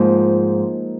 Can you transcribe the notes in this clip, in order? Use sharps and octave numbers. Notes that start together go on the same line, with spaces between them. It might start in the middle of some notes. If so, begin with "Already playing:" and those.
Already playing: G#2 F3 A#3